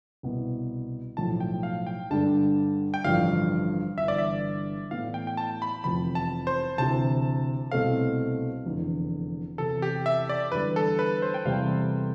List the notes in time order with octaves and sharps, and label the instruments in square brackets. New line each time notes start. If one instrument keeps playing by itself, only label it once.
[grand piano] C2 B2 B3
[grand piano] B1 A2 F3 [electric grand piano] A5
[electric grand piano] G5
F5
G5
[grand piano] G2 D3 G3 D4 [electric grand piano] A5
[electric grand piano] G5
[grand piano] A1 G2 D3 F3 [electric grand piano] F5
[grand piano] G1 G2 E3 [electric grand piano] E5
[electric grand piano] D5
E5
[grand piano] A2 E3 B3 E4 [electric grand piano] F5
[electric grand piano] G5
G5
A5
B5
[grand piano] F1 E2 C3 F3 [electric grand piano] B5
[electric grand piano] A5
C5
[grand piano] D2 C3 E3 [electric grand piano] A5
[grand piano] C2 B2 A3 C4 [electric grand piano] F5
[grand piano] F1 E2 D3
[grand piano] E2 C3 E3 [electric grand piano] A4
[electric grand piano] G4
E5
D5
[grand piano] E2 D3 G3 [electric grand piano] B4
[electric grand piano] A4
B4
C5
G5
[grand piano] E2 C3 G3 [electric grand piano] F5